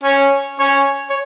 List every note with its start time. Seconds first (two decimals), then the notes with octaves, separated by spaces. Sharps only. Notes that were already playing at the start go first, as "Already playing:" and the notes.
0.03 C#4 C#5
0.60 C#4 C#5
1.10 C#5